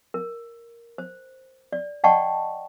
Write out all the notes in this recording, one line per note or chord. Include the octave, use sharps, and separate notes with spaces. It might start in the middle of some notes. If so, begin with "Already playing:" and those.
A#4
C5
D5
D5 D#5 F#5 G5 A5 C#6